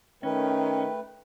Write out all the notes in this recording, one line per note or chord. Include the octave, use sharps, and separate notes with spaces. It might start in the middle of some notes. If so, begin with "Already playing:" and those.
D#3 A3 C#4 B4 G5